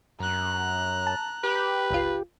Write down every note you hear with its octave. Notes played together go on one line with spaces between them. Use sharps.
F#2 A#5 F#6
A5
G4 B4
G1 C#2 F4